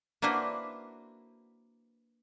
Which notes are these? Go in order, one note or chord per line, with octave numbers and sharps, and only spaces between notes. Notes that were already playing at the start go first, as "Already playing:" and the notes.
A#3 D4 E4 F#4 B4 C5